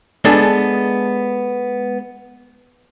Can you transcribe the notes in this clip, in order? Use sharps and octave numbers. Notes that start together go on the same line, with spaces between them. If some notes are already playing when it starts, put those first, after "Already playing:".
G#3 B3 D4 G#4 A4